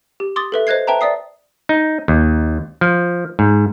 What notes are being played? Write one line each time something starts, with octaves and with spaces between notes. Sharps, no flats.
G4
C6 D6 D#6 A6
A4 B4 E5
C5 D#5 F#6 G#6 C7
B4 E5 G5 A5 A#5
D5 E5 D#6 C7
D#4
D#2
F3
G#2